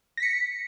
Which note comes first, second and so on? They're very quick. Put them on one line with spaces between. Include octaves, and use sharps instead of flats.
A#6 B6 C#7